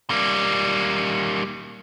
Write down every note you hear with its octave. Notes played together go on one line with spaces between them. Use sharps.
G3 A#3